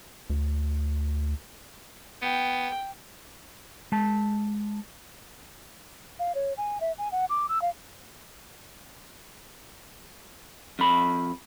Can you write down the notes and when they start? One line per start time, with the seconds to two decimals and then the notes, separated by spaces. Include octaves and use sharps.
0.30 D2
2.22 B3 G5
3.92 G#3 A5
6.19 F5
6.35 C#5
6.57 G#5
6.80 E5
6.98 G#5
7.12 F#5
7.30 D6
7.49 E6
7.62 F5
10.79 F2 B5